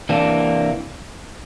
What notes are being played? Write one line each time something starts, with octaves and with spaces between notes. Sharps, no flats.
C3 E3 A#3 D4